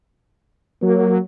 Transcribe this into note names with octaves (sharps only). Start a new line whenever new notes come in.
F#3 A#3